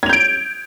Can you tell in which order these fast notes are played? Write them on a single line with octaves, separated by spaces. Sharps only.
G#6 F7 G6 D7